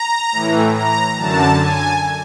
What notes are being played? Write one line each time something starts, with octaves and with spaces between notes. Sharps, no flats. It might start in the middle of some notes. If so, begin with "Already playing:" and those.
Already playing: A#5
A2 E3
A#5
F#2 D3 A5
G#5